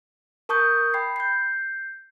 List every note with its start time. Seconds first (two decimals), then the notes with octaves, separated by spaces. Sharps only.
0.49 A#4 A5 C#6 D#6 G6
0.94 G5 B5 G#6 C7
1.16 G6 C7